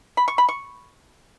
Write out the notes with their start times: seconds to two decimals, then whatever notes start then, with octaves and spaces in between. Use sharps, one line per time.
0.17 B5
0.28 C#6
0.38 B5
0.49 C#6